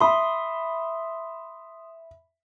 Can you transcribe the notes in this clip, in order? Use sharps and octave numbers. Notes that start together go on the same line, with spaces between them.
E5 B5 C6 D#6